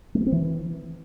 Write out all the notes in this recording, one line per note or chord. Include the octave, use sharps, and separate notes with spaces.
A3
B3
C4
E3